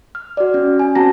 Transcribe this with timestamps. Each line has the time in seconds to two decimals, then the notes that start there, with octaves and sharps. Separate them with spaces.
0.15 F6
0.37 F#4 D5
0.54 C#4
0.79 C#4 G#5
0.95 C4 F#4 A5 A#5 A#6